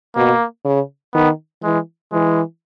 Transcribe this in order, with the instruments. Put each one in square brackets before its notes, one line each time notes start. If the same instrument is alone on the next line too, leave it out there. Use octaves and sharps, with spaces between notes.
[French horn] B2 [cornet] A#3
[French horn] C#3
[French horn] D#3 [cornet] B3
[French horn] E3 [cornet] G#3
[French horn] E3 [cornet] G#3